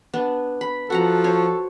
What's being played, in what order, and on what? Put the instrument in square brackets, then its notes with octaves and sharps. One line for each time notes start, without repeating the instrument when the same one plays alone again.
[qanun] B3 D4
B5
[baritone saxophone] F3 [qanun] F#4 F#5 A#5 [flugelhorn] A4
[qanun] C5 C#5